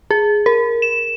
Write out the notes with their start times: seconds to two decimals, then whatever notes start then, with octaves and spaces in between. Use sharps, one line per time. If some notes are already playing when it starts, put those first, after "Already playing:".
0.11 G#4
0.46 A#4
0.82 E7